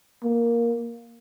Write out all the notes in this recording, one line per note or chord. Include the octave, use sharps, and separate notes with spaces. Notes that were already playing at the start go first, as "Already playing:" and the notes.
A#3